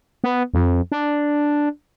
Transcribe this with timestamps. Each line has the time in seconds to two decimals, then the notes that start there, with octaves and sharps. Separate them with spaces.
0.24 B3
0.54 F2
0.92 D4